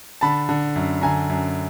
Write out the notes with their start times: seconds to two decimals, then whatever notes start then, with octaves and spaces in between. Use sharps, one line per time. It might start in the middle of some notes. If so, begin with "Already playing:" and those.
0.21 D3 A5 B5
0.49 D3
0.76 F#2
1.02 D3 G#5 A#5
1.30 F#2